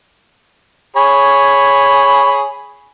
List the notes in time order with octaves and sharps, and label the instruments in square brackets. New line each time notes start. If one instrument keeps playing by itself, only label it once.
[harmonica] G#4 C#5 B5